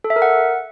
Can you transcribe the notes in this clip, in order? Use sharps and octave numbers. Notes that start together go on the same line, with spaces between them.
A4
E5
A#4
F#5